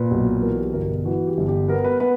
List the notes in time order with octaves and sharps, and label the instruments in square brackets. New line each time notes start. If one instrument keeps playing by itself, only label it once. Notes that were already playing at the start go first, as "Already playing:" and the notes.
Already playing: [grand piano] A#2 B4
B1
E3 A#4
G4
G1 A#4
E3 F#4
G4
G1
G4
B3 A#4
B4
B3 B4